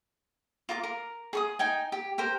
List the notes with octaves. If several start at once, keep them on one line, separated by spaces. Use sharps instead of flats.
F4 A#4 D6
A#4
G#4 C#6 D#6
D#4 G5 G#5
G4
G4 A#4 C5